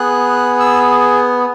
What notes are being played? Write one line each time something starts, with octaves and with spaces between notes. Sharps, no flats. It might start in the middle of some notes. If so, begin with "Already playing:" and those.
Already playing: B3 G#4 F#6
E6